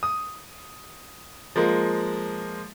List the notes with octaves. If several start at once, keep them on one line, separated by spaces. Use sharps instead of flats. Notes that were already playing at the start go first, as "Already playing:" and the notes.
D#6
F3 G#3 A#3